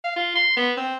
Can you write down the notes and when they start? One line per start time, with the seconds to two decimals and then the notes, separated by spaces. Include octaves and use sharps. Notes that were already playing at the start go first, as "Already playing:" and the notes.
0.04 F5
0.16 F4
0.36 C6
0.57 B3
0.77 C4